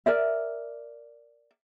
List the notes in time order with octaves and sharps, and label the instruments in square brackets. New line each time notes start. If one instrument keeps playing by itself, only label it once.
[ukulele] A#4 D5 E5